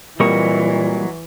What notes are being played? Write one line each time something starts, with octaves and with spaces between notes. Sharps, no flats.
A#2 E3 F#3 G3 A#3 C4 D#5 C#6